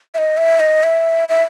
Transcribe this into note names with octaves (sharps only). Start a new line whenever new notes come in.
E5
D#5
E5
D#5
E5
E5